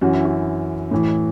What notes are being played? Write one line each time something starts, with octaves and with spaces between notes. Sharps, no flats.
F#2 E3 F#4
E4
F#4
A2 E3